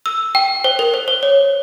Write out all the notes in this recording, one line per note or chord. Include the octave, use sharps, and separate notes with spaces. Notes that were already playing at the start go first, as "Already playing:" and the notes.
E6
G5
C5
A#4
C5
C5
C#5